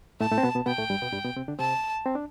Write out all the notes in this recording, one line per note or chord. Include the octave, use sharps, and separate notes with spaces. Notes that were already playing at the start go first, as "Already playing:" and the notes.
A2 A3 A5
A2 A3
C4
B2 B3
B2 B3
B2 B3 G5
A2 A3
G2 G3
B2 B3
G2 G3
B2 B3
C3 C4
D3 D4
C3 C4 A5
C4
D4